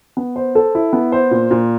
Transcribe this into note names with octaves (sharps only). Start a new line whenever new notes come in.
B3
C5
A4
E4
B3
C5
A#2
A#2